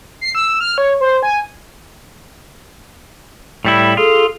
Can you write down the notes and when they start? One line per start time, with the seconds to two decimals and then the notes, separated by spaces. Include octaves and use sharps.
0.21 C7
0.35 E6
0.61 F6
0.78 C#5
1.01 C5
1.23 G#5
3.65 A2 G3 E4
3.97 F4 G#4 A4